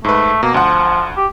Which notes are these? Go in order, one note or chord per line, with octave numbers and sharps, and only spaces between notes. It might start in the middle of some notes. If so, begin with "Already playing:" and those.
G#2 A3 B4
B2 A#3
D2 F3 F#5
G4